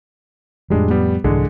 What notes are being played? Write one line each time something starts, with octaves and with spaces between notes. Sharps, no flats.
F2 A2 F3 G3 G#3 D4
G3 B3
C2 G#2 D3 E3 G#3